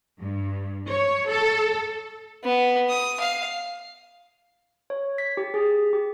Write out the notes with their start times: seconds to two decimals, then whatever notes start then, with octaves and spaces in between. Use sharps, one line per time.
0.19 G2
0.88 C#5
1.30 A4
2.44 B3
2.89 D#6
3.20 F5
4.90 C#5
5.18 B6
5.37 G4
5.54 G#4
5.93 G4